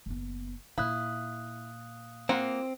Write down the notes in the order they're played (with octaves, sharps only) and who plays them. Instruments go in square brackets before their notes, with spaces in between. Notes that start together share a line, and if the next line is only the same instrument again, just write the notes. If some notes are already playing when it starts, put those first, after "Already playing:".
[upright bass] F#1 B3
[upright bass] A#2 [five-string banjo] E4 [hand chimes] F5 D#6 F#6
[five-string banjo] A#3 F4 F#5 [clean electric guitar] C4